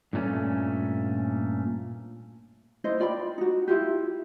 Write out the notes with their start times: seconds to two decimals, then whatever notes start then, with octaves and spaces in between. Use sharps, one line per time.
0.13 G2 A#2 A3 C#4
2.84 D#4 E4 C5 D#5
3.00 F4 D5 G5 B5
3.38 D#4 F#4
3.68 E4 F4 G4